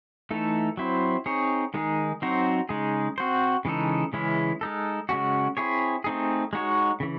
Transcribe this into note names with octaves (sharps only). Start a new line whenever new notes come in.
E3 A3 D#4 A4
F#3 C4 E4 C5
C4 D#4 G#4 C#5
D#3 G#3 D#4 G#4
F#3 C4 D#4 F#4 C5
C#3 G#3 D#4 G#4
C4 F#4 C5
C#3 E3 G#3 D#4 A4
C#3 E3 G#3 C#4 E4
G#3 D#4 A4
C#3 G#3 C#4 F#4
C4 E4 G#4 C#5
A3 C4 D#4 G#4
G#3 D#4 F#4 C#5
C#3 E3